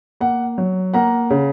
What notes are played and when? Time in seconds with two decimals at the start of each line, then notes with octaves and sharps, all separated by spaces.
0.21 A#3 F#5
0.58 F#3
0.94 A#3 F#5 A#5
1.30 C#3